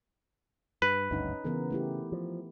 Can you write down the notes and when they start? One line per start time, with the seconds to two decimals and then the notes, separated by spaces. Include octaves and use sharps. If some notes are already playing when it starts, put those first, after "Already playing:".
0.82 G2 B4
1.11 G#1 D2 G2 C#4 D#4
1.45 C#3 E3 B3 A#4
1.70 A3 E4 G4
2.12 F3